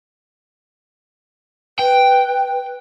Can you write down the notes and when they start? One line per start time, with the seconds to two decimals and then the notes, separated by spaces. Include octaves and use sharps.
1.79 B4 G5